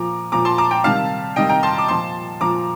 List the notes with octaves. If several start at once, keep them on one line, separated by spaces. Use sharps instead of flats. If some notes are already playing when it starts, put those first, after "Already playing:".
Already playing: A#2 F3 A#5 D6
A#2 F3 A#5 D6
A5 C6
A#5 D6
G5 A#5
C3 D#3 G3 F5 A5
C3 D#3 G3 D#5 G5
G5 A#5
A5 C6
D6
A#2 F3 A5 C6
A#2 F3 A#5 D6